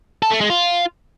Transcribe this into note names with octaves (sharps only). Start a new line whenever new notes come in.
A4
A3
G#3
F4